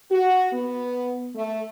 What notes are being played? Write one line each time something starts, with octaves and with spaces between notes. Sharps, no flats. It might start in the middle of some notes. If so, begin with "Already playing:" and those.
F#4
B3
A3